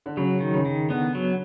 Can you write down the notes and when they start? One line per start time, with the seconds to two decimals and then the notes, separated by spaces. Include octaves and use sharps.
0.06 D3
0.17 C#3 F#3
0.40 D#3
0.54 C#3
0.65 D#3
0.89 D3 B3
1.15 F#3